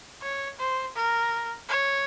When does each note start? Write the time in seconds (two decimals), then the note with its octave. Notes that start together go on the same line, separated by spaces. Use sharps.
0.22 C#5
0.59 C5
0.96 A#4
1.69 C#5